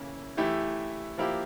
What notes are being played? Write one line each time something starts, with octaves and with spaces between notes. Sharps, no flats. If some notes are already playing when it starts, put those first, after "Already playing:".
Already playing: C#3 E3 A#3 C#4 E4
E3 A3 E4 G4
F3 A#3 E4 G4